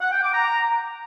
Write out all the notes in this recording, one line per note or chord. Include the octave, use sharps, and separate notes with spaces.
F#5
G5
D6
A#5